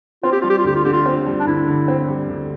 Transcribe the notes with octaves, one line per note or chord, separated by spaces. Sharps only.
C4 F4
G4
G3 F4
G4
F4
D2 G4
F4
D3 G4
F4
C4
G3
D4
D2 E4
D3
C4
G3
D2